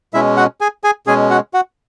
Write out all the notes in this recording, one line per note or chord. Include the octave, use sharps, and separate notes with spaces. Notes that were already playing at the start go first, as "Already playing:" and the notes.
B2 G#3 C#4 E4 E5
F#4 F#5
G#4 G#5
G#4 G#5
B2 G#3 C#4 G#4 G#5
F#4 F#5
F#4 F#5